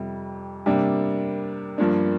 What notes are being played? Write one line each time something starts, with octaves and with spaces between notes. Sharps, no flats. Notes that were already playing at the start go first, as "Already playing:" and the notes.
Already playing: F2 C3 G3
C3 G3 A#3 D4
G2 F3 A#3 D4